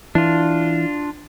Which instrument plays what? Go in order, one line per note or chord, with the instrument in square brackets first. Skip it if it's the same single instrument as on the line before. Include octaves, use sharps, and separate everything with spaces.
[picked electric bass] E3 [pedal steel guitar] D4 F4